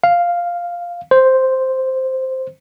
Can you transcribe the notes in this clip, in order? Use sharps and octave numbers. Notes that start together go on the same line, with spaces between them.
F5
C5